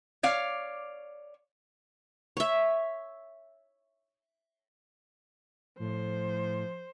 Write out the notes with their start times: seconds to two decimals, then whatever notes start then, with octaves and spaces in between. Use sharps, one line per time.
0.23 C#5 D5 F5
2.37 C#5 E5
5.79 A2 F3 C5